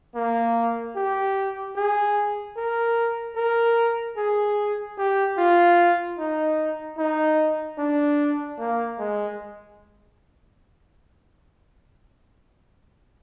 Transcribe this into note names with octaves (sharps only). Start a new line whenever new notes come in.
A#3
G4
G#4
A#4
A#4
G#4
G4
F4
D#4
D#4
D4
A#3
G#3